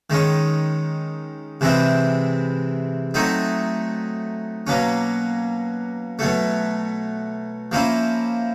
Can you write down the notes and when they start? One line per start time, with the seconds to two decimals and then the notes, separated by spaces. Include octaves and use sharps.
0.10 D#3 G#3 C#4
1.61 C3 E3 G#3 C4 E4
3.14 F#3 A3 C4 D#4
4.67 B2 F#3 A#3 C#4
6.19 B2 F#3 A3
7.72 F3 A#3 C#4 E4